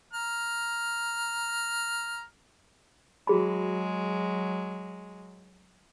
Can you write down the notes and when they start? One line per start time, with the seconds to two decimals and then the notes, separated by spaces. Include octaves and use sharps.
0.13 A#5 F6
3.27 F#3 G#3 F#4 G#4 B5